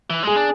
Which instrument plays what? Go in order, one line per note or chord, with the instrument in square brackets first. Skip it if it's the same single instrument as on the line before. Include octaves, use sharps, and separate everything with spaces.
[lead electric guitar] E3
[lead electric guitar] G#3 [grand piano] G#4
[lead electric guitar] D4